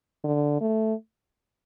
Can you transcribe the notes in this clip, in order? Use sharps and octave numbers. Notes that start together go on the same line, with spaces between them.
D3
A3